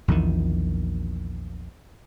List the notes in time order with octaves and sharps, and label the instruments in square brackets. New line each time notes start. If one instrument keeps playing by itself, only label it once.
[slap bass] A#1 E2 A#2 D#3